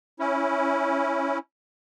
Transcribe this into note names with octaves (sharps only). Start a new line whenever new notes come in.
C#4 E4